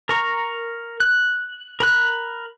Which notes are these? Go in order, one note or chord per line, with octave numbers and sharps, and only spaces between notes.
A#4 A#5 C#6
F#6
A#4 B5 F#6